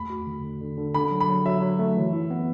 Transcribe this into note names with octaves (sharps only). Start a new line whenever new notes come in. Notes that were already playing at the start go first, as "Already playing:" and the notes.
Already playing: E2 A3 B5
F#4
D3
D3
D3
D3
D3 B5
F#3
B5
F#3
F#3 E5
F#3
A3
E3
E4
B3